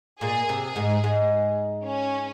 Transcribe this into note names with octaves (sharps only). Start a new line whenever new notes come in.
A#2 A#3 G#4
C3 C4
G#4
G#2 G#3
G#2 G#3
C#4